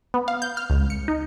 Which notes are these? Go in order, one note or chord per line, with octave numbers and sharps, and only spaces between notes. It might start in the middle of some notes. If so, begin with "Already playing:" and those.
B3
F5
G6
F6
C#2
C#7
D#4